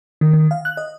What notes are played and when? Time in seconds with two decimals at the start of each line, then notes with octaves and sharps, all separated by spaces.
0.21 D#3
0.33 D#3
0.51 F5
0.65 F#6
0.77 D#5